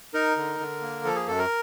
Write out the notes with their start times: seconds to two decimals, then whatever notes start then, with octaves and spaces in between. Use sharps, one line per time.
0.14 D#4 A#4
0.37 D3
0.60 D3
0.82 A#3
1.05 F3 A4
1.15 G#4
1.27 F#2 A4
1.38 A#4